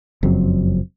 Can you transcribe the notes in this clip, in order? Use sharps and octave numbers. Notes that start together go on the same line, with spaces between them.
F#1 F2 F#3 C4